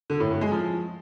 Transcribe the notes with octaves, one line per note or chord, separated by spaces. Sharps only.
D3
A2
A2
G#3
F3